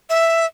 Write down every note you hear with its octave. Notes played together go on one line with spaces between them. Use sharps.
E5